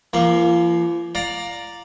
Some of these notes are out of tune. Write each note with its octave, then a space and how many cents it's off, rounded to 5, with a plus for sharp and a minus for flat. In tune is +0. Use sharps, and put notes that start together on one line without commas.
F3 -45 A#3 +0 F5 +0
D5 +0 F5 +20 A#5 +0